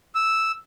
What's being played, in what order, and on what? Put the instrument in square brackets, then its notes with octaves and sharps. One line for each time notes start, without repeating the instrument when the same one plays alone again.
[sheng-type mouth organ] E6